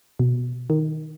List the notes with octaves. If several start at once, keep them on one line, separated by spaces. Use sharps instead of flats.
B2
D#3